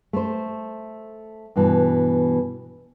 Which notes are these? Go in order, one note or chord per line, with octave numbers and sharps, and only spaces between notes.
A3 C5
G2 B2 E3